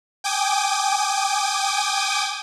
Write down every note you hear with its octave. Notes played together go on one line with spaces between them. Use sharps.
G5 G#5 D6 D#6